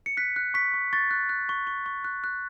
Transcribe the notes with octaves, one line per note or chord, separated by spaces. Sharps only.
C#7
F#6 B6
F#6
C#6 B6
C#6
C#6 A6
F#6
F#6
C#6
C#6
C#6
F#6
F#6